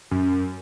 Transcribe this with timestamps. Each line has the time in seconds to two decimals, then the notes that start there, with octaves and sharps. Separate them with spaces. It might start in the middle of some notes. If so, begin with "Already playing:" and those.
0.11 F#2